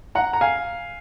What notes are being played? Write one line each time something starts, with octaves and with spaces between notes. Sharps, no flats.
F#5 A#5
A#5
F5 G#5